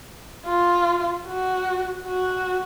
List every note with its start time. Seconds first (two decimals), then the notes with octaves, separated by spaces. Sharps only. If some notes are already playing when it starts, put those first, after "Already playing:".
0.47 F4
1.27 F#4
2.07 F#4